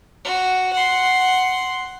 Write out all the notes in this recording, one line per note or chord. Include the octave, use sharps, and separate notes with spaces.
F#4
F#5 C6